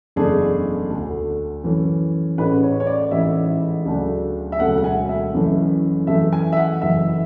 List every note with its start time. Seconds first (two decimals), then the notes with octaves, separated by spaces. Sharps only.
0.16 F#1 E2 B2 A3 D4 G#4
0.90 D2 D3 A3
1.64 F#2 E3 A3 C#4
2.38 A1 A2 G#3 C#4 B4
2.63 C#5
2.80 C#5
2.87 D5
3.11 A1 G#2 E3 E5
3.85 D2 C#3 F#3 A3 D4
4.52 E5
4.60 E1 D2 C#3 F#3 A3 F#5
4.78 F#5
4.84 G#5
5.09 E5
5.34 F#1 F#2 E3 A3 C#4
6.07 F#2 E3 A3 E5
6.33 G#5
6.53 E5
6.57 F#5
6.82 F#1 F#2 E3 A3 E5